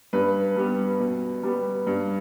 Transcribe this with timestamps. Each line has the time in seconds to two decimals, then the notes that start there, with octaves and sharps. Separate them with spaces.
0.13 G2 B4
0.56 G3 B3
1.00 B2
1.43 G3 B3
1.87 G2